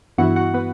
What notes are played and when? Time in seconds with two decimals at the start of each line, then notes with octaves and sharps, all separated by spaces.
0.18 G2 E3 B3 E4 F#4 F#5
0.36 F#4 F#5
0.54 B3 B4